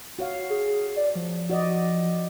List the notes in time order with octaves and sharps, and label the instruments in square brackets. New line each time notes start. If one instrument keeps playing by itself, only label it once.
[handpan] F#4 C#5 F5
[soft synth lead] G#4
D5
F3
[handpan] F#4 D5 D#5